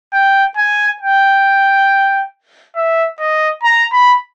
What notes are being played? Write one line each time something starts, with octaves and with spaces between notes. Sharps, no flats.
G5
G#5
G5
E5
D#5
A#5
B5